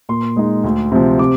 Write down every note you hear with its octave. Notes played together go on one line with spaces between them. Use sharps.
A#2 C6
G#3 D#4
D2
C3 F3
C3 D6